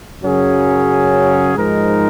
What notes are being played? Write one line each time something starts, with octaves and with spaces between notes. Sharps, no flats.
F#2 C#3 F#3 C#4 G#4
G#2 F3 G#3 D#4 A#4